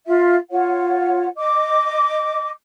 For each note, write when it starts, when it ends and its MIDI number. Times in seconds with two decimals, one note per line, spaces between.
0.06 0.34 65
0.06 0.34 76
0.50 1.27 65
0.50 1.27 73
0.50 1.27 78
1.36 2.49 75
1.36 2.49 86